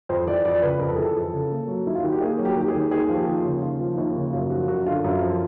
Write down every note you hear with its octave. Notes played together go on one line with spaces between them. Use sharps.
F2 C5
E3 D5
F2 D5
C#3 B4
F2 A#4
A4
E3 G#4
A4
F2
C#3
A#3
F#3
D#2 E4
F4
D#3 F#4
G4
A#3 G#4
F#3
G4
D#2 G4
G#4
D#3
D#2 G#4
F3
G4
D#2
F4
C#3
D#2 F4
F3
D#4
D#2 E4
C#3
F#2 F4
F3 F#4
F#2 F#4
D3 F4
F#2
F3